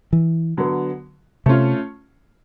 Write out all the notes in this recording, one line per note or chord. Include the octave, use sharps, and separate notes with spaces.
E3
D3 F#3 B3
C3 A3 C#4 F4